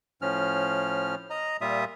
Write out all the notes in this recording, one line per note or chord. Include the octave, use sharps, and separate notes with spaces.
A2 F3 C#4 F6
D#5 A#5
A#2 G3 F4 E5 D#6